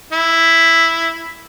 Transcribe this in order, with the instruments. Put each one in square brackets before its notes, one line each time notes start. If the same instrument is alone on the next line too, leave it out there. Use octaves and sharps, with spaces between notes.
[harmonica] E4